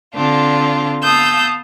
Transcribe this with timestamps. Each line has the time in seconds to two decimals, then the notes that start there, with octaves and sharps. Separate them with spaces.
0.14 D3 C4 D4 F4
1.02 B3 F5 A5 D#6 E6 G6